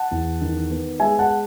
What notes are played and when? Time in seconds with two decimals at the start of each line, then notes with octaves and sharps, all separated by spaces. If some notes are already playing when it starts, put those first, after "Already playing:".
Already playing: F#5 A5
0.11 E2
0.41 D#3
0.70 B3
1.00 G#3 E5 G#5
1.19 F#5 A5